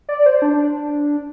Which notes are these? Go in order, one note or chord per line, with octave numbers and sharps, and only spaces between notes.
D5
C5
D4